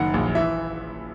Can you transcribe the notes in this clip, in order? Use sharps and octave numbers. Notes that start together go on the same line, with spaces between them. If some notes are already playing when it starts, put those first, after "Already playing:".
Already playing: F#1 D#3 F#5
A#1
E3 E5